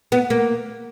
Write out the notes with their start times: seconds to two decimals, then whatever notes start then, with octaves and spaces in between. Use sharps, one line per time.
0.12 B3
0.30 A#3